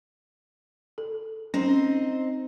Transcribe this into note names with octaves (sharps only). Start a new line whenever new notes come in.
A4
C4 C#4 D#4